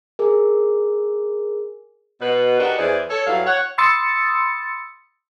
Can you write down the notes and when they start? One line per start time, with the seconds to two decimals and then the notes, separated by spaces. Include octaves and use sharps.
0.19 G#4 A#4
2.21 B2 B3 B4
2.59 D4 D#4 F#4 G4 A#4 B4
2.77 E2 E3 G#4 C5 D5
3.09 A4 C#5
3.26 G2 F#3 G3 E4 A4 F5
3.46 C#5 F#5
3.78 B5 C6 D#6 E6 A6 C#7